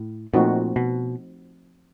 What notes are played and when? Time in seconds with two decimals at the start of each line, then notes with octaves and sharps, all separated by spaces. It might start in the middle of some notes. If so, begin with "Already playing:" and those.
Already playing: A2
0.34 A#2 F3 A3 C4 D#4 F#4
0.76 B2